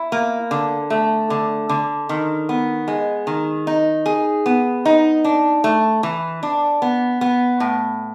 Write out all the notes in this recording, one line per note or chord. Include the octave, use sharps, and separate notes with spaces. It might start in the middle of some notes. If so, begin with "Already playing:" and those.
Already playing: E4
A#3
D3
A3
D3
D3
D#3
B3
G#3
D#3
D#4
G#4
B3
D#4
D4
A3
E3
D4
B3
B3
A2